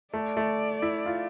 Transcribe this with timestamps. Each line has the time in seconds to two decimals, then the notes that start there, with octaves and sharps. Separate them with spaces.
0.14 A3 D5
0.37 A3
0.82 E4
1.06 F4